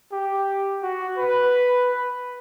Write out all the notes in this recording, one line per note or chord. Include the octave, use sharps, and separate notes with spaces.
G4
F#4
B4